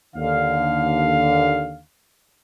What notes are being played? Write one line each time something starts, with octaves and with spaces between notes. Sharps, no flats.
D#2 D3 F5